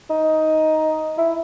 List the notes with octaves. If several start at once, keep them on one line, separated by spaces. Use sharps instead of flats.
D#4
E4